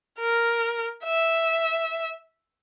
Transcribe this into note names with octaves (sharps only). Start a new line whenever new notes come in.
A#4
E5